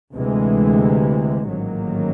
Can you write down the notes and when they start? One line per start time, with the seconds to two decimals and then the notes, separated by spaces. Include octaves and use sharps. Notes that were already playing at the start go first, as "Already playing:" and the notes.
0.14 D2 C3 E3 G#3
1.48 A1 G#2 D#3 F#3 A#3